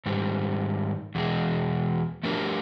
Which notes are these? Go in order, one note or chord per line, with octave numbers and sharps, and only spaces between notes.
G#2 D#3 G3
E2 B2 G#3
F3 A3 D4 G4 A#4